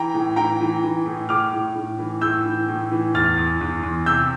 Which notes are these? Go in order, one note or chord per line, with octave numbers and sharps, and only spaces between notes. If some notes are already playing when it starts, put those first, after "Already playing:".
Already playing: E3 G5 A#5
A2
E3 G5 A#5
E3
E3
A2
A2 D6 F6
A2
A2
E3
A2 E6 G6
E3
A2
E3
E2 F6 A6
E2
E2
E2
C3 E6 G6